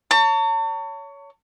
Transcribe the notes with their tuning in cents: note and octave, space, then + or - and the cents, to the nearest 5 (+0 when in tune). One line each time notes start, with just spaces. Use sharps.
C#5 +20 A5 +40